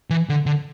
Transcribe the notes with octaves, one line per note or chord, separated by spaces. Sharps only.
E3
D3
D3